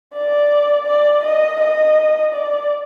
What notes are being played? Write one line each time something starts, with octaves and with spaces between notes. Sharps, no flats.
D5
D5
D#5
D#5
D5